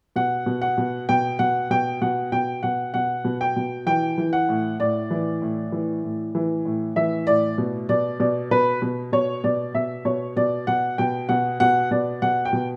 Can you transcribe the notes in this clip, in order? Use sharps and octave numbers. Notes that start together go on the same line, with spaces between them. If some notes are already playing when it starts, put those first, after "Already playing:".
B2 F#5
B2
F#5
B2
B2 G5
B2 F#5
B2 G5
B2 F#5
B2 G5
B2 F#5
B2 F#5
B2
G5
B2
E3 G5
E3
F#5
A2
A2 D5
E3
A2
E3
A2
E3
A2
E3 E5
A2 D5
B2
B2 D5
B2 D5
B2 B4
B2
B2 C#5
B2 D5
B2 E5
B2 C#5
B2 D5
B2 F#5
B2 G5
B2 F#5
B2 F#5
B2 D5
B2 F#5
G5
B2